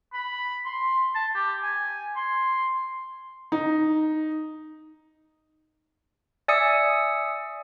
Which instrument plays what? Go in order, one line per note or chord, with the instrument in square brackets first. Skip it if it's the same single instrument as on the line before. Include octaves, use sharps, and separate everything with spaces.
[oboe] B5
C6
A5
G4
G#5
C6
[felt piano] D#4
[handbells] D5 E5 G#5 D#6 E6 C#7